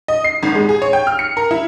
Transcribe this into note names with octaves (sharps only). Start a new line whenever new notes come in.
D#5
C7
G#1
G#3
G#4
C#5
G5
F6
C#7
A#4
E4